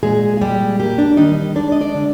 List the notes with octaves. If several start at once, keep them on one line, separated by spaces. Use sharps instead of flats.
A#2 G#3 G#4
F4
G3 G#3 G4
G3 A#3 G4
D4
D#3 G3 D#4
G#3 D4 D5
D#5
D4 D5
D3